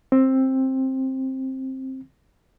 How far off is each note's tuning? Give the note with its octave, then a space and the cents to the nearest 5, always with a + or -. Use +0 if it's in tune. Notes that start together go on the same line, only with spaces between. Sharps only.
C4 +15